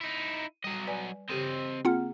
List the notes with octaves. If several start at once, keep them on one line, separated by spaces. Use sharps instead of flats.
D#4 E4
F#3 G3 D#5
B4 D5 G#5
C#3 C4 G4 A4 D#5
A#3 C4 F4 G#4 F#5 F6